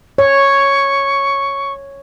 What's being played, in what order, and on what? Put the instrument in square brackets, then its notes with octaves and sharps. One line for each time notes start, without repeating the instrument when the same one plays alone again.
[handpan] C#5 [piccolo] C#6